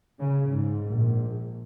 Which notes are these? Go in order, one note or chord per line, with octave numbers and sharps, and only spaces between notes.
C#3
G#2
A#1